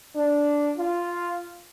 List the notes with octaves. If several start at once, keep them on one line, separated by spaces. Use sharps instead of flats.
D4
F4